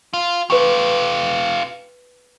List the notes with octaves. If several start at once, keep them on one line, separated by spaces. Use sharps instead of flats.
F4
F4 G4 B4 C#6